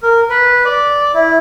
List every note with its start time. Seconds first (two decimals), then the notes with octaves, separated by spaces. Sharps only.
0.03 A#4
0.30 B4
0.65 D5
1.14 E4